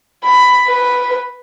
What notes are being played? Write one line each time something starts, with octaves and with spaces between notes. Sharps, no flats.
B5
B4